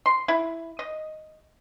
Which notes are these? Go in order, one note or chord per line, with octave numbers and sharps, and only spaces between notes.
C6
E4
D#5